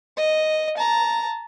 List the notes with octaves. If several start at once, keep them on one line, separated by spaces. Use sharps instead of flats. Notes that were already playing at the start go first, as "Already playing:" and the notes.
D#5
A5 A#5